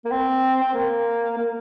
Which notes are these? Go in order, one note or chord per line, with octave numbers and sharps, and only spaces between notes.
A#3
C4
C4
A#3
A#3